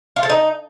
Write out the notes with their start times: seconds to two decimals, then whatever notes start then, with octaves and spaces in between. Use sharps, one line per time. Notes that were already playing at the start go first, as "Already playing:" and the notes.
0.16 F4
0.23 A4
0.30 D#4